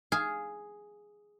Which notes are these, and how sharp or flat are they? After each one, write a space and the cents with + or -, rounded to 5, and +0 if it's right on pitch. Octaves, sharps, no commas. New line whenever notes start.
G#4 +0 F5 +0